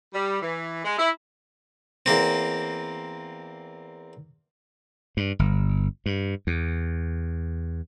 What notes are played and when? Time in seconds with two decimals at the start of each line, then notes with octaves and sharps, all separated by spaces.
0.13 G3
0.42 E3
0.85 G#3
0.98 E4
2.06 E2 A#3 C4
5.17 G2
5.39 G1
6.06 G2
6.47 E2